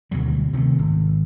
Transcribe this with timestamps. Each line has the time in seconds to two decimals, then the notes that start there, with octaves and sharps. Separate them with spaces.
0.11 D2 B2 F#3 G3
0.53 C3 D#3 A3
0.78 G#1